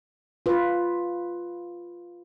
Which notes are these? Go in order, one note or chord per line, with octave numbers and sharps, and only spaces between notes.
F4 B4